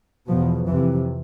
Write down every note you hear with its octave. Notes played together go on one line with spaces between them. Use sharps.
E2 B2 F3
F2 C3 E3